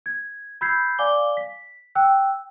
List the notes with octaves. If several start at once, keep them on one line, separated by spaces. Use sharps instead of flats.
G#6
B5 E6 G6 G#6 B6 C7
D5 F5 G#5 D6 G7
B6
G5 E6 F#6